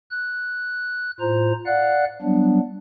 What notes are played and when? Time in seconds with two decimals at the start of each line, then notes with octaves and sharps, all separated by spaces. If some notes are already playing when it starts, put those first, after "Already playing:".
0.11 F#6
1.20 A2 F4 C5 A#5
1.66 D5 F5 F#5 F#6
2.22 F#3 G3 B3 D4